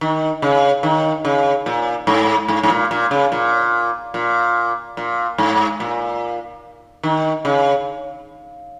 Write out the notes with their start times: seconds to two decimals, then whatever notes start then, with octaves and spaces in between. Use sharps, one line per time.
0.01 D#3
0.42 C#3
0.83 D#3
1.25 C#3
1.66 A#2
2.07 G#2
2.48 G#2
2.63 G#2
2.70 A#2
2.91 A#2
3.11 C#3
3.32 A#2
4.14 A#2
4.97 A#2
5.38 G#2
5.80 A#2
7.03 D#3
7.45 C#3